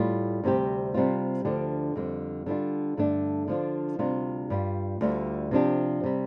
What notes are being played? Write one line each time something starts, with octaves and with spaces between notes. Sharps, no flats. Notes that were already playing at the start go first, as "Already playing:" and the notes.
Already playing: A2 G3 F4
D2 C3 G3 C4 G4
C3 G3 C4 F4
D2 D3 F3 D4 G4
F2 D3 G3
D3 G3 D4 F4
G2 D3 A3 D4
D3 F3 D4 F4
D2 C3 G3 D4 F4
G2 G3 F4
D2 D3 G3 F4
C3 F3 D4 G4
C3 G3